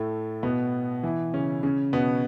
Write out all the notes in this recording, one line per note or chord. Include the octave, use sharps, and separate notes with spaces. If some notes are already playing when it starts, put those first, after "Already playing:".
Already playing: A2 A3
B2 B3
E3 E4
C#3 C#4
C#3 C#4
B2 B3